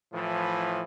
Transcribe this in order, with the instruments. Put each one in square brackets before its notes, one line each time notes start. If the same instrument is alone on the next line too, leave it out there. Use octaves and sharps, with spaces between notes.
[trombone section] A2 E3 F3